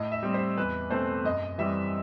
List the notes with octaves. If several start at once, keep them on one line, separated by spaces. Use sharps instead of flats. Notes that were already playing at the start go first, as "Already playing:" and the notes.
Already playing: A2 D#5
E5
G3 C4
C5
E2 B4
B2 A3 C4 C5
F#2 D#5
E3 G3 C4 E5